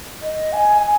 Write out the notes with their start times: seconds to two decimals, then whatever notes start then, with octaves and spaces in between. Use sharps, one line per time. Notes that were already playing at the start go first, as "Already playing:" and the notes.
0.22 D#5
0.53 G#5
0.82 G#5